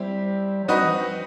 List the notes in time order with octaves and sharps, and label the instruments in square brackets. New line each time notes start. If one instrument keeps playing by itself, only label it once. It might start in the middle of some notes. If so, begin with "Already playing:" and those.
Already playing: [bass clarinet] G3 [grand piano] C4 E4 G4
[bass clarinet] F#3
[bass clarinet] G3 [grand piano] C4 D#4 F#4 B4 D#5
[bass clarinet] E3
F3